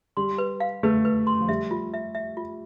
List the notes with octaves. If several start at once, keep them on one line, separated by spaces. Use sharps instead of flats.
G3 C6
B4
F5
A3 B4
B4
C6
F3
G3 E5
F4
E5
E5
F4